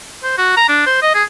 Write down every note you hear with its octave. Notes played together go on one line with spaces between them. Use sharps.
C5
F#4
A#5
D4
C5
D#5
G#4